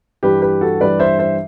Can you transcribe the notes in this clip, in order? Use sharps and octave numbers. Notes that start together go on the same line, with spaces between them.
G2 E3 G3 G4 B4
G4 B4
F#4 A4
G2 E3 G3 B4 D5
C5 E5
C5 E5